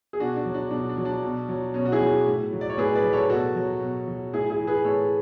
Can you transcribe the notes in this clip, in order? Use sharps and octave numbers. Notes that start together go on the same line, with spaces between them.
G#4
B2 D4 F#4
D4
F#3
D4
B2 D4
D4
F#3
D4
B2
F#3
B2 C#4
F#4
E4 G#4
F#3
A2
F#3
D5
C#5
A2 G#4 B4
B4 D5
F#3
A4 C#5
B2 F#4 A4
F#3
B2
F#3
A2 E4 G#4
E4 G#4
E3
G#4 B4
A2 A4 C#5